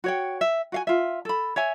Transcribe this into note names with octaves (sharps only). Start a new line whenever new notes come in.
F#4 C#5 G5
E5
F#4 F5 G#5
F4 E5
A4 B5
C#5 E5 G#5